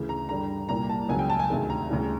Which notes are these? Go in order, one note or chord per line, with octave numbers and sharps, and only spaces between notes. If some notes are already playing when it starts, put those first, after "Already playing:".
Already playing: D2 C#3 E3
A#5
G2 D3 G3 A#5
C2 A#2 G3 A#5
A5
C#2 C#3 F#3 G#5
G5
A5
G#5
D2 C3 D#3 G#3
A#5
D2 C#3 E3 G3